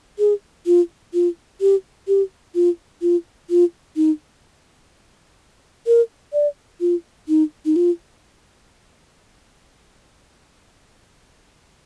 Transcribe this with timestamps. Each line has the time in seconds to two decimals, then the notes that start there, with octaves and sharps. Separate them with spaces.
0.19 G#4
0.66 F4
1.14 F4
1.61 G4
2.08 G4
2.55 F4
3.02 F4
3.50 F4
3.96 D#4
5.87 A#4
6.33 D5
6.81 F4
7.28 D#4
7.65 D#4
7.76 F4